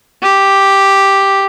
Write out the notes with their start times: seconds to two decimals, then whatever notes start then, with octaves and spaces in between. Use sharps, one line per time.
0.22 G4